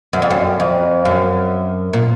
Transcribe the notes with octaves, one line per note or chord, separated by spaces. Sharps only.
F#2
F2
F#2
F2
F#2
A#2